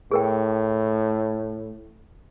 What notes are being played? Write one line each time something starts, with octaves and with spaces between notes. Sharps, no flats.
A2 G#4 A#4 G5